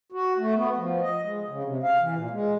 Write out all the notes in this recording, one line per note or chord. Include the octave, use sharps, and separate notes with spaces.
F#4
A3
B3
F3
D#5
G#3
C#3
C3
F5
E3
A#2
G#3